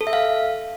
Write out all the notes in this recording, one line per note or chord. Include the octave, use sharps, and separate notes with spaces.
A4
E5
F5